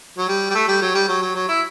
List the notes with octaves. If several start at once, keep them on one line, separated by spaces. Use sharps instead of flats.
F#3
G3
G3
A3
G3
F#3
G3
F#3
F#3
F#3
E4